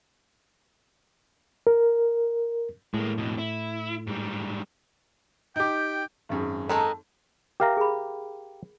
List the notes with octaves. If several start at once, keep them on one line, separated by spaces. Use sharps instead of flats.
A#4
A2 G#3 A#3
F2 B2
E4
G#2 G3
D#4 G4 G5 D6 G6
G#1 F#2 G#4
D#3 G#3 D#4 A4
G4 A#4 E5 F5 A#5
G#4 B5